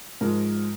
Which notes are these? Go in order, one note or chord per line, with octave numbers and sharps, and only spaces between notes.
G#2 F3 G#3 A#4